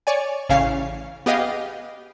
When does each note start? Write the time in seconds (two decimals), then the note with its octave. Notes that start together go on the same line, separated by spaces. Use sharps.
0.07 C#5 D5 G#5
0.49 A1 C#3 C#4 F5 C7
1.26 B3 G4 G#4 D#5 F5